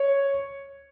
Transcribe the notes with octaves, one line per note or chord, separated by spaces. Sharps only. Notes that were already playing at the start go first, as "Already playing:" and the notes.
Already playing: C#5